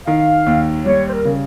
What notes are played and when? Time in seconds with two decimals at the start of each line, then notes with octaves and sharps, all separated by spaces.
0.07 D#3 F5
0.46 D#2
0.86 G3 C#5
1.08 C5
1.12 A#4
1.25 C#3